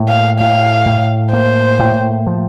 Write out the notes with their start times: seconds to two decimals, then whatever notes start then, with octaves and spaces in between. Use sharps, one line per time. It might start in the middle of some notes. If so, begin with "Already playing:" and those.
Already playing: A2 A#3
0.09 F5
0.39 A2 F5
0.86 A2
1.32 A#3 C5
1.79 A2
2.27 F3